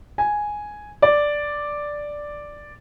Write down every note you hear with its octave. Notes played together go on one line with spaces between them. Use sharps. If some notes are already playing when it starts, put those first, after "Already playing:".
G#5
D5